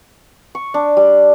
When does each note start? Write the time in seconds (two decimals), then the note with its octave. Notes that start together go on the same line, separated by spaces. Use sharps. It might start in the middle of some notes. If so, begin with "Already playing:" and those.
0.55 C#6
0.74 D4
0.97 G3